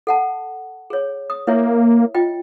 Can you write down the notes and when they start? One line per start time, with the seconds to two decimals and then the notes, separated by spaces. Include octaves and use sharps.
0.07 A4 F#5 A5
0.90 G#4 C#5
1.30 D#6
1.47 A#3 E4 C#5 E5
2.14 F4 D#5 G5